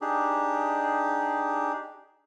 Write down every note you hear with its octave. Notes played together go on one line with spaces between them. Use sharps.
D4 D#4 G4 G#4